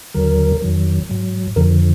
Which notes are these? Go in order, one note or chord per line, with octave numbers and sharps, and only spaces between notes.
D#2 D3 F#3 A#4
F2 D#3 F#3
G#2 F#3
F2 D3 F3 A#4